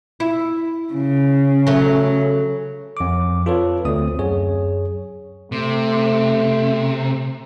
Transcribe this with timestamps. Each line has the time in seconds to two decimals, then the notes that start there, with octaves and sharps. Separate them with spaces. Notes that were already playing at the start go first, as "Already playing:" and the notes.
0.20 E4
0.93 C#3
1.67 F#3 A3
2.97 F2 D6
3.46 F4 A4 B4 C#5
3.85 D2 C4 D#6
4.19 F#2 G#4 C#5
5.52 C3 A3